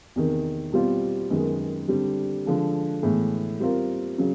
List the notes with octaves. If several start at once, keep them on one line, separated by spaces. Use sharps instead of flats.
E2 C3 D#3
B2 G3 C4 F4
F#2 D#3 G#3 B3
D3 G3 C4
D3 F3 G#3
A2 E3 G#3 B3
G3 C4 F4 A#4
C#3 F#3